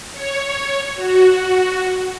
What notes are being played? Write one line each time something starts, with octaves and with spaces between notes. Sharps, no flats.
C#5
F#4